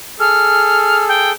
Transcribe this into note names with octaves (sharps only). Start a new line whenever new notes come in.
G#4 A4 F6
G5